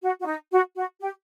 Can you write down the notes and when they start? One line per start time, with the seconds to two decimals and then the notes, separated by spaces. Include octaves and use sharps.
0.02 F#4
0.21 F#4
0.26 D#4
0.51 F#4
0.76 F#4
1.00 G4